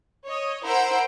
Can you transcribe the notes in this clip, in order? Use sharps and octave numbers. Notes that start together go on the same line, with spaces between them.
C#5 D#5
E4 A#4 C5 F#5 E6 D7